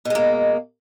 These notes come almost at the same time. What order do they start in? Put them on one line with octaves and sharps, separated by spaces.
B2 G#3 A#3